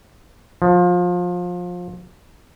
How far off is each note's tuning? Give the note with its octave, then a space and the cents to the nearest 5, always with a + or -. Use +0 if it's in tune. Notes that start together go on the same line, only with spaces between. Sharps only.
F3 +25